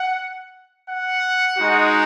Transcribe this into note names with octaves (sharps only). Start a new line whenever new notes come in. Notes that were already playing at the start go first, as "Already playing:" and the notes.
Already playing: F#5
F#5
G#3 D#4 F#4